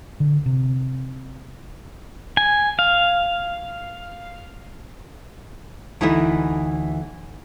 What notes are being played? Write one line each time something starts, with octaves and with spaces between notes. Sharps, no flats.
D3
C3
G#5
F5
D2 E3 D#4 E4 E5